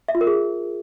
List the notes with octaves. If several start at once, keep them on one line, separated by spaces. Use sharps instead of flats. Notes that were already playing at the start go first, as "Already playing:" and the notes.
E5
F4
A#4
G#4